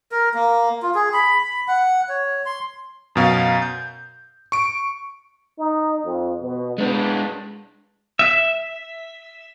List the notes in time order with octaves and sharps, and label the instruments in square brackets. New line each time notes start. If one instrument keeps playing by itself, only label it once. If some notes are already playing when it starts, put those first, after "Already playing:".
[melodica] A#4
A#3
F4
G#4
B5
B5
F#5
C#5
C6
[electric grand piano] F#2 B2 F5
G6
C#6 D7
[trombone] D#4
F2
B2
[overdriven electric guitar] G#3 D4 [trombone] B3
[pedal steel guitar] E5